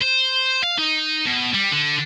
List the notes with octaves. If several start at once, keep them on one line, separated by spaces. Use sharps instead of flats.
C5
F5
D#4
B2
G3
D3